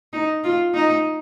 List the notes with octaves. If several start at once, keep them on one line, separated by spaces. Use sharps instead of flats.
D#4
F4
D#4